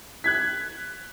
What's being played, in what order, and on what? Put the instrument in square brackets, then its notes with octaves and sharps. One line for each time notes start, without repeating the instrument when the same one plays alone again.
[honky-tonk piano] F#6 G#6 B6